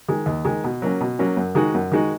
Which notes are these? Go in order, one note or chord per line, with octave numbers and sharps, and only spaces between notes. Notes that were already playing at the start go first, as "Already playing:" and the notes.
D#3 G#3
D#2
D#3 G#3
B2
F#3 A#3 C#4
B2
F#3 A#3 C#4
F#2
D#3 G#3 D#4 F#4
F#2
D#3 G#3 D#4 F#4